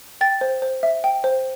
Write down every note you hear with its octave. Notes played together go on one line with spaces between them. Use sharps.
G5 A6
C5
C5
E5
G5
C5